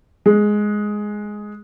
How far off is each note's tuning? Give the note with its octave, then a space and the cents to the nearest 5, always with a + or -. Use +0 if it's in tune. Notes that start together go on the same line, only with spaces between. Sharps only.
G#3 +5